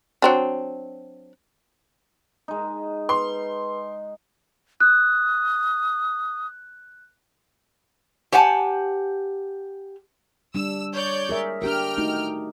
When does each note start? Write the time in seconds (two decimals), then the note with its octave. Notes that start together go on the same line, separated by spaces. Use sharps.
0.22 F#3 C4 D4
2.48 G#3 D#4
3.09 B4 C6
4.80 D#6 F#6
8.32 G4 C5 F#5 G#5 A5
10.55 G3 D4 E6
10.94 C#5 D5 G6
11.29 G#4 A#4 E5
11.62 D4 G4 A#4 G5 F6
11.98 A3 D#4 F#4